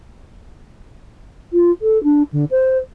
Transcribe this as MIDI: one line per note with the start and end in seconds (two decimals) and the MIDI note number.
1.53 1.71 65
1.81 2.01 69
2.03 2.22 62
2.32 2.44 50
2.51 2.78 72